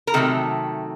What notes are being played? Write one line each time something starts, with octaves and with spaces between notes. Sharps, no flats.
A#4
C3 D#3 F#3 A3 A4